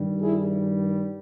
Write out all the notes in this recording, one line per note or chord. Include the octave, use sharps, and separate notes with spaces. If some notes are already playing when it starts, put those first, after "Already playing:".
Already playing: G2 D#3 G3
E4 G#4